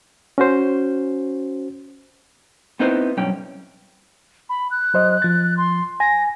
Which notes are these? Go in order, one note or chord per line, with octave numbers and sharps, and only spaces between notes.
C#4 F#4 C5
B3 C4 D#4 E4 B4 C5
B1 G2 C#4 G5
B5
F#6
F#3 C5 D#5
F3 A6
C6
G#5 A#6